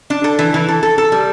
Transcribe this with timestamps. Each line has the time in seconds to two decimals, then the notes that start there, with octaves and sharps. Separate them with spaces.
0.10 D4
0.24 A4
0.39 E3
0.54 E3
0.68 A4
0.83 A4
0.98 A4
1.12 G3